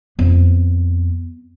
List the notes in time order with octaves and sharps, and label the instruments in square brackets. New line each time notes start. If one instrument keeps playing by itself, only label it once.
[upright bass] F2 B3